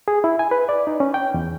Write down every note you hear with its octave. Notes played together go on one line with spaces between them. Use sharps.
G#4
E4
G#5
B4
D5
D#4
C#4
G5
E2